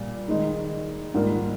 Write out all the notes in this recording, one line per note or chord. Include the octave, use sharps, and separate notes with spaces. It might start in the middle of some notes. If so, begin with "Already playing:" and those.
Already playing: A#2 G3
D#3 G#3 D#4
G#2 G3 A#3 F4